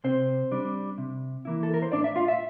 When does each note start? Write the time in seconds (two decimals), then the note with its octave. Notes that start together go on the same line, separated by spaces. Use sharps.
0.04 C3 C4 C5
0.52 G3 D4
0.98 C3
1.45 E3 A#3 E4
1.63 A4
1.74 A#4
1.82 C5
1.92 A2 D4 D5
2.04 E5
2.16 F4 F5
2.28 E5